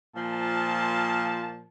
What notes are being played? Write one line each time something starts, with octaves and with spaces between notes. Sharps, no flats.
A#2 F3 A5